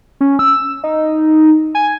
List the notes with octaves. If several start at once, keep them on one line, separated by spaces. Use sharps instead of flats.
C#4
E6
D#4
G#5